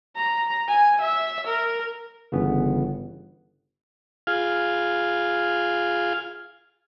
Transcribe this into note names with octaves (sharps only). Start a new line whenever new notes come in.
A#5
G#5
E5
A#4
G1 C#3 E3 B3
F4 G#4 F5